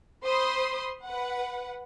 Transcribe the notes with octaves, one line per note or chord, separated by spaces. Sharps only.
C5 B5 C6 D#6
B4 F#5